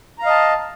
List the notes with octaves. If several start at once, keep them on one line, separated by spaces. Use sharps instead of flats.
D#5 F5 A5 A#5